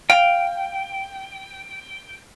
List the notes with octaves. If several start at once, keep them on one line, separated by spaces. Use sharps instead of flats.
F5 G5